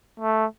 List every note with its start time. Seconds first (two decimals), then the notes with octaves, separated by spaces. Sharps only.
0.20 A3